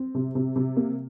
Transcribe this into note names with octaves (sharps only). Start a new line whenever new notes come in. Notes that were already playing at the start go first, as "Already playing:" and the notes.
Already playing: C4
C3
C3
C3
A#3